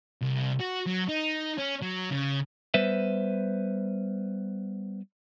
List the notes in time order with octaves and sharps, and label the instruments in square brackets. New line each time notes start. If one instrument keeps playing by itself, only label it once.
[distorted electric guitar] C2
F#4
F#3
D#4
C#4
F#3
C#3
[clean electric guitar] G3 B3 B4 C5 E5